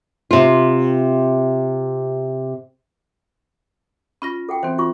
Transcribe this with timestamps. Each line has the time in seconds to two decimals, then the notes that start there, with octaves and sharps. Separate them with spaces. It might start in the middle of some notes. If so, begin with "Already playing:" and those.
0.31 C3 F4
4.22 C#4 F4 B5 A#6
4.49 A4 F#5 G5
4.63 E3 C4 C5
4.78 F4 C#6